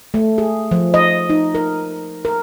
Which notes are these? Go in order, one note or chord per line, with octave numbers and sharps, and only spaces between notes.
A3
G#4
F3
D#5
D#4
A#4
A#4